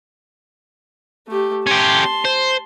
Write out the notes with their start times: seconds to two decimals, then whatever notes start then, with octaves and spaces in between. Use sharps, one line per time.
1.27 A3 G4
1.67 C#4 G4 A5 C6
2.25 C5